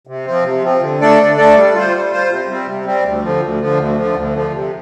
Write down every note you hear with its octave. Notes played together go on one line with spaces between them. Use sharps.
C3
F3 C4
C3
F3 C4
D3
A3 D4 A4 D5
D3
A3 D4 A4 D5
G3
F4 C5
G3
F4 C5
C3
G3 C4
C3
G3 C4
D2
D3 F3
D2
D3 F3
D2
D3 F3
D2
D3 F3
C3